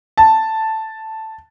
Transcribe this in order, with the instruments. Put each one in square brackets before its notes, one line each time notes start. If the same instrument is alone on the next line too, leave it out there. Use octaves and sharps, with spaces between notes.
[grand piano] A5